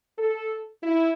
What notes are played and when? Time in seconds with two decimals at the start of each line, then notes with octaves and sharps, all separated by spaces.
0.19 A4
0.83 E4